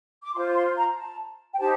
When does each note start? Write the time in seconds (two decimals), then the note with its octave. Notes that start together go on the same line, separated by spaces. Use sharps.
0.23 D6
0.34 F4 C6
0.38 C5
0.55 C6
0.76 A#5
0.97 A5
1.52 G5
1.59 D#4 G4 C5 A5